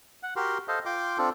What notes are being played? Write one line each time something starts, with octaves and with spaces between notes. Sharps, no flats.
F#5
F#4 G4 A#4 C6
A4 C5 D#5 F5
F4 G5 C6 D6
C4 D4 F4 A4